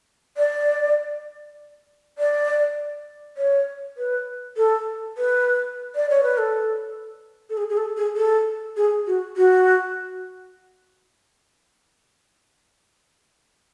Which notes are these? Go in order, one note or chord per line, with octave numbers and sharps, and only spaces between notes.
D5
D5
C#5
B4
A4
B4
D5
C#5
B4
A4
A4
G#4
G#4
A4
G#4
A4
G#4
F#4
F#4